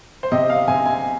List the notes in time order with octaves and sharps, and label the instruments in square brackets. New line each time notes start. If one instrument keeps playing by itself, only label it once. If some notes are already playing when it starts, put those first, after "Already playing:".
[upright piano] C5
C3 D#5
F5
C3 G#5
G#5